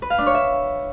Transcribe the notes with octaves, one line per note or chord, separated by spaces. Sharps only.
B4
F5
D4
C#5
E5